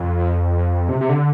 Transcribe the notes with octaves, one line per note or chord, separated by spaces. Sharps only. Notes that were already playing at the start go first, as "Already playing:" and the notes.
Already playing: F2
C3
C3
D3